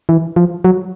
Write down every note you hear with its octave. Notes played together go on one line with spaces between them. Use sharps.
E3
F3
F#3